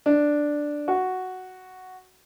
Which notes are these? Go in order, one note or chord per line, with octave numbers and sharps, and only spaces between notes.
D4
F#4